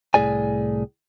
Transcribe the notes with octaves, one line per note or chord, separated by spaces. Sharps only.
C2 A2 G#4 D5 G#5